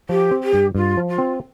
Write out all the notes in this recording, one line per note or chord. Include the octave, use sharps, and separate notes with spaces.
F3 G4
C4
G4
G2
G2 F4
F3
F4
C4